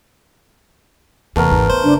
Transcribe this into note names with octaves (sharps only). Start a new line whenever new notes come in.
E2 C3 E3 A3 B3 A#4
G#1 D#2
D#3 C5
F#1 C#3 D4